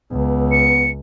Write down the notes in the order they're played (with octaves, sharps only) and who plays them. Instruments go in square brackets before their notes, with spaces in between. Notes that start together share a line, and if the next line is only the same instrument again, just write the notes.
[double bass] C#2 [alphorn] B3
[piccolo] C#7